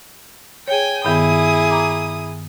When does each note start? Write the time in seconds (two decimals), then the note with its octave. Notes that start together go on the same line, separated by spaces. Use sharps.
0.68 G#4 C#5 G5 G#5
1.05 G2 D#3 B3 E4 G#4 D#6
1.70 A#5 D6